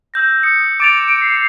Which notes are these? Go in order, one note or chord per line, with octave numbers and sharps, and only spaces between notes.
E6 G6 A#6
D#6 C#7
D6 A6 D7 F7
C7